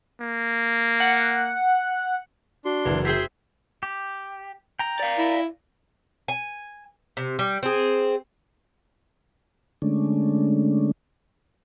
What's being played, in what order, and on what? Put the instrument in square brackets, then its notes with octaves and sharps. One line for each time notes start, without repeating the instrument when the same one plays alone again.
[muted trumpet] A#3
[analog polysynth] F#5
[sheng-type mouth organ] D4 C6 [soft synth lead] F#4
[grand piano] F#1 [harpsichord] E2
[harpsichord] C4 G#4 G5 [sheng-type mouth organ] E5
[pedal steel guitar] G4
G5 A#5
[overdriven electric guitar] D5 F5
[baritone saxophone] E4
[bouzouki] G#5
C3
G3
C4 G#4
[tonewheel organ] D3 G#3 A3 C#4 D4